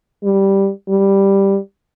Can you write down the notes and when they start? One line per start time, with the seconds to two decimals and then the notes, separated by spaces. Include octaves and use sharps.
0.24 G3
0.89 G3